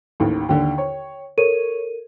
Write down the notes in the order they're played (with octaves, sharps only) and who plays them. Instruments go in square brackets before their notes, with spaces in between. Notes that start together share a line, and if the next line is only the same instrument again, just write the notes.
[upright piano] A1 D#2 D#3
[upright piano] D#2 D3 [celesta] G5
[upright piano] C#5
[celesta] A4 A#4 D#7 [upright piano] C#5